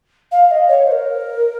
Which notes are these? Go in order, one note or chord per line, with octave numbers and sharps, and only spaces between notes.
F5
D#5
C#5
C5
A#4